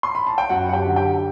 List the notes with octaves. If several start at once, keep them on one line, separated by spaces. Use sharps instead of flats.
C6
B5
A5
G5
F#2 F#4 F#5
F#5
G4 G5
D3
G4 G5